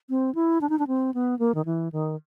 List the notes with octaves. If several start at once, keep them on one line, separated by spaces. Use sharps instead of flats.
C4
E4
D4
D#4
D4
C4
B3
A#3
D#3
E3
D#3